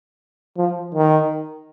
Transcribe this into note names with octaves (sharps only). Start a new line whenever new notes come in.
F3
D#3